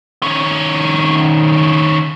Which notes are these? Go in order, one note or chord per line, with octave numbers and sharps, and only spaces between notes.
D#3 C#4